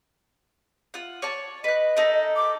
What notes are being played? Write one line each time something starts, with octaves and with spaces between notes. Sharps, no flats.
F4 F#5
C#5 D5 A5
B4 D#5 F#6
D#4 A4 A#4
D6